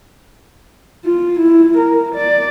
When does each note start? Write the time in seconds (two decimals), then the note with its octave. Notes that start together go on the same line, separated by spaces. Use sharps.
1.05 F4
1.39 E4
1.77 A#4
2.15 D5